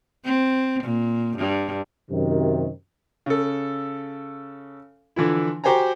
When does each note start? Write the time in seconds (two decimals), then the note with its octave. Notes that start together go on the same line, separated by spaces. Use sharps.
0.25 C4
0.83 A#2
1.37 G2
2.11 F#2 C3 D#3
3.26 C#3 A4
5.16 D3 E3 F3 E4
5.64 F#4 G4 C5 G5 G#5 A#5